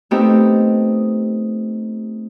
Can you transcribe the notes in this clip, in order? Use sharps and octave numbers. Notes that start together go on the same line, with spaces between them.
A3 B3 C4 D#4 G4